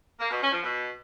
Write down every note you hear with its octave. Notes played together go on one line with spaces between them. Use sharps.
A#3
B2
C#4
F3
B2